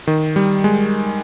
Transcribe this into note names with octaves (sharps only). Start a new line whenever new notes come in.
D#3
G3
G#3